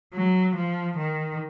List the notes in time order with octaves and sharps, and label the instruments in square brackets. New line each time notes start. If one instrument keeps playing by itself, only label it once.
[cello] F#3
F3
D#3